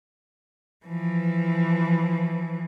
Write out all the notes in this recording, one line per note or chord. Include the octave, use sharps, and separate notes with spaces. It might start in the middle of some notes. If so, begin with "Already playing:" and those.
E3 F3